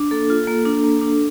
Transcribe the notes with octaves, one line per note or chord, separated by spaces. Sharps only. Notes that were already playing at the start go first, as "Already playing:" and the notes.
Already playing: D4
A#3 A4
F4
A#3
D4
A#3
D4